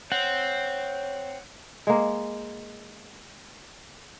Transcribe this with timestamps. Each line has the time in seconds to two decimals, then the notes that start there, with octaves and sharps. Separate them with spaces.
0.12 C4 C#5 F#5
1.87 G#3 A#3